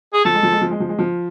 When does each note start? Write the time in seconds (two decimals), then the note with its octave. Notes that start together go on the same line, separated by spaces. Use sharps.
0.13 G#4
0.25 F3 A4
0.34 G#3
0.43 F3
0.52 G#3
0.61 F3
0.71 G#3
0.80 F3
0.89 G#3
0.99 F3